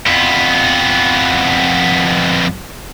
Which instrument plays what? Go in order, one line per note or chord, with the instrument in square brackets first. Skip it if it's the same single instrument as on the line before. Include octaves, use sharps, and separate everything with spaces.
[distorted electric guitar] F2 B3